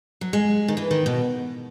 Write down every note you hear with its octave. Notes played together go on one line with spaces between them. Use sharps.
F#3
G#3
D#3
E3
D#3
B2